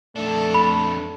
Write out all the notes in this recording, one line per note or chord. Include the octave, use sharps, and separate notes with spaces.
F2 A3 D4 A4
B5